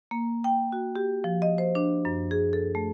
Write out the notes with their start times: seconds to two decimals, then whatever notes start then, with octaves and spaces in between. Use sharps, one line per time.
0.11 A#3
0.44 G5
0.72 F#4
0.96 G4
1.24 F3
1.42 D#5
1.58 C5
1.75 D4
2.05 F#2
2.31 G#4
2.53 A4
2.75 A3